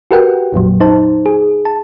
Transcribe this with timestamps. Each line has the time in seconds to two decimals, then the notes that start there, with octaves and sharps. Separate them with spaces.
0.11 F#4 G4 A#4 B4 F#5 G5
0.53 A1 F2 A#2 F#3
0.80 D#4 C5 A5
1.26 G#4
1.65 A5